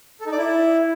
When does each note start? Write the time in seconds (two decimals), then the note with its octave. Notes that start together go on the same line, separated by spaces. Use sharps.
0.21 A4
0.26 D#4
0.32 D5
0.38 E4